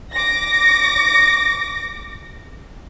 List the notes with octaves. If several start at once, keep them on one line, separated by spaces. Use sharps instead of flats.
D6 A#6